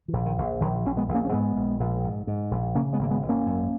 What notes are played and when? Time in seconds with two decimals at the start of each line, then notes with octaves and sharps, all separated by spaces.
0.08 E3
0.13 A#1
0.26 D#3
0.38 A#1
0.61 A#1 D#3 F#3
0.85 A#1 C#4
0.97 G#3 B3
1.08 A#1
1.14 A#3 C#4
1.25 C#4
1.32 G#2 G#3 B3
1.56 A#1
1.80 A#1
2.04 G#2
2.27 G#2
2.51 A#1
2.75 C#3 A#3 C#4
2.93 G#3 B3
2.99 G#1 A#3
3.11 G#3 B3
3.22 G#1
3.29 A#3 C#4
3.46 F#2